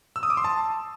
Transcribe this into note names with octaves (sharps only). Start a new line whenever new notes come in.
E6
D#6
D6
C6
A5